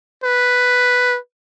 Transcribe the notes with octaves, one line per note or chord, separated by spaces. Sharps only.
B4